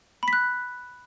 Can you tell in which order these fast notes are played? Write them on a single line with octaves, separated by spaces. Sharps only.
B5 B6 F#6